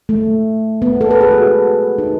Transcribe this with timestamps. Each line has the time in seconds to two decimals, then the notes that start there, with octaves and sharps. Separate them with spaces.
0.09 A3
0.82 B3
1.01 A4
1.11 B4
1.21 G#4
1.31 F#4
1.98 D#4